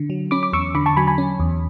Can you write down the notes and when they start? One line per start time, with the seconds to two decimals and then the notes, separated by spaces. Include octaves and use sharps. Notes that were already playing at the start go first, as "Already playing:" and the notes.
Already playing: D3
0.10 F#3
0.31 C#4 B5 D6
0.43 D6
0.53 E2 C#6 E6
0.75 D3 B5 D6
0.86 A5 C#6
0.97 F#3 G#5 B5
1.07 G#5 B5
1.18 C#4
1.40 E2